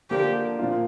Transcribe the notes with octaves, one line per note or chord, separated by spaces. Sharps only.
D3 F3 A#3 D4 G4
A#2 F3 A#3 F4